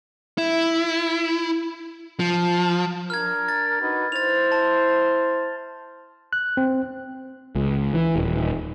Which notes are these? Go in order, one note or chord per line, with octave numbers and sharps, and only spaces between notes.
E4
F3
D4 A#4 F6 G#6
A6
D#4 F#4 B4
E4 C5 A6 F7
A5
F#6
C4
C#2
E3
D#1